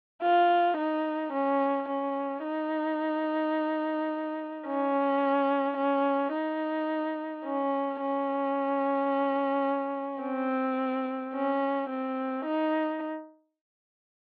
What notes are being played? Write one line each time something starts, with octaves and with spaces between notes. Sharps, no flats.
F4
D#4
C#4
C#4
D#4
C#4
C#4
D#4
C#4
C#4
C4
C#4
C4
D#4